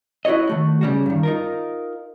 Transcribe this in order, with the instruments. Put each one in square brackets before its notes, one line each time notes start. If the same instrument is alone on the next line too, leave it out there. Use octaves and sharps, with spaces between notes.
[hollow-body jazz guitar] E4 F#4 A4 C#5 D#5
D#3 A3 F#4
C#3 G3 F#4
G2 D#3
D#4 F4 A#4